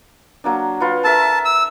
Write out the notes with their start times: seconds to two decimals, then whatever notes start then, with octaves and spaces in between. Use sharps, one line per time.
0.44 F#3 A#3 D4
0.80 F4 B4 F#5
1.04 A4 A#4 E5 A5
1.45 E6